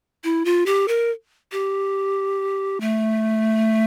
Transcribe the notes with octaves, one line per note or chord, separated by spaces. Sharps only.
E4
F4
G4
A#4
G4
A3